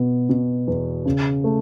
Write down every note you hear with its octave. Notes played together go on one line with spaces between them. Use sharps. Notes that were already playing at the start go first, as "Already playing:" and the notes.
Already playing: B2 B3
B2
E2
C#3
A3